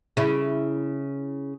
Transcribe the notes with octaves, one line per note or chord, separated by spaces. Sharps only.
C#3 E4